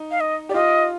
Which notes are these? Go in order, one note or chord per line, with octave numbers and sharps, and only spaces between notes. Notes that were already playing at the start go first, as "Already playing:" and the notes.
Already playing: D#4
F5
D#5
G4 D5
F4 D#5